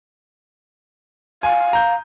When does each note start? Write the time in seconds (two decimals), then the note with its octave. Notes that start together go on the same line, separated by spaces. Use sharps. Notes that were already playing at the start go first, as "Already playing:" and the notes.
1.43 F5 G#5
1.73 A#5 G6